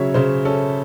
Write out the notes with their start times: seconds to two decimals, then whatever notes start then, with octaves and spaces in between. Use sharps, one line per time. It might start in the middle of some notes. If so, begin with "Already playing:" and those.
Already playing: C#3 F#3 C#4 C#5 E5
0.14 C#3 C5
0.45 C#4 A4